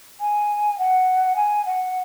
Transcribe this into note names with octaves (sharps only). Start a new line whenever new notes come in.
G#5
F#5
G#5
F#5